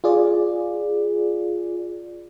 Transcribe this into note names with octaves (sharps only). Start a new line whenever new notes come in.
F4 G#4 D5